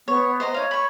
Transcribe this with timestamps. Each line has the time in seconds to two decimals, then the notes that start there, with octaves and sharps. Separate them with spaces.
0.08 B3 C#5
0.40 C5 D#5 A#5
0.54 D#4 C#5 F5
0.71 B5 C#6